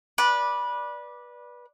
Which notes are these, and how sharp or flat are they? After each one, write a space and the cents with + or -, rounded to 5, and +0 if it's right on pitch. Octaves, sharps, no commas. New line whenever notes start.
B4 -20 D5 +0